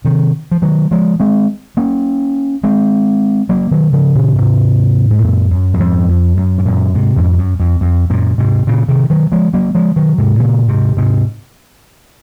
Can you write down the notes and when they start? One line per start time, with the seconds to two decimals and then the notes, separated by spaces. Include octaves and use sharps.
0.05 C3 D#3
0.51 F3
0.62 D#3 F#3
0.91 F3 G#3
1.20 G#3 C4
1.77 A#3 C#4
2.64 G#3 C4
3.49 F#3 A#3
3.71 D#3 F#3
3.93 C#3 F3
4.15 A#2 C#3
4.36 G#2 C3
5.10 G#2
5.23 F#2 A#2
5.51 F#2
5.74 F#2
5.80 F2 G#2
6.09 F2
6.37 F#2
6.58 G#2
6.65 F#2 A#2
6.94 G#2 C3
7.16 F2 G#2
7.32 G#2
7.38 F#2
7.60 F2
7.81 F2
8.10 F#2 A#2
8.38 G#2 C3
8.67 A#2 C#3
8.88 C3 D#3
9.10 D#3 F#3
9.32 F3 G#3
9.53 F#3 A#3
9.75 F3 G#3
9.96 D#3 F#3
10.18 G#2 C3
10.40 A#2 C#3
10.68 G#2 C3
10.97 G#2 C3